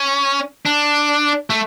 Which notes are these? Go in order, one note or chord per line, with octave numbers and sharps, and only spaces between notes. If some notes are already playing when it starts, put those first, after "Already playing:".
Already playing: C#4
D4
A3